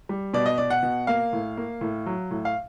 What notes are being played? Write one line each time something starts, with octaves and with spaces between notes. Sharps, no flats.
G3
B2 D5
D#5
B2 D5
F#5
B2
A#3 F5
A2
A#3
A2
F#3
A2
F5